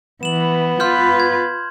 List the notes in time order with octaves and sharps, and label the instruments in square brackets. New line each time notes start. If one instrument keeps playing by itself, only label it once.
[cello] E3 [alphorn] B3 [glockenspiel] E7 F#7
[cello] F4 B4 [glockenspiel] C6 F6 G6
[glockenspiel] G#6